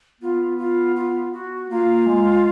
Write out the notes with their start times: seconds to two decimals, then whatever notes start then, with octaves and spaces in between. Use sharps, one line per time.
0.21 B3 F4
0.58 F4
0.96 F4
1.33 F#4
1.70 A#3 F4
2.07 G#3